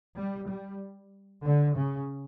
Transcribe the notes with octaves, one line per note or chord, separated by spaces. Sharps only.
G3
G3
D3
C#3